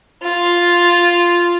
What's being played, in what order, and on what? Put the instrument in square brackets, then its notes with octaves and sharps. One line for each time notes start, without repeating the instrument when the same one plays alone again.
[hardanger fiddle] F4